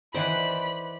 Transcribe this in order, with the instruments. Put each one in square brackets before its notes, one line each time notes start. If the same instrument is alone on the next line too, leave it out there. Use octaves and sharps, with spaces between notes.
[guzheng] D#3 E3 B4 [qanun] C5 D5 F#5 [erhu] B5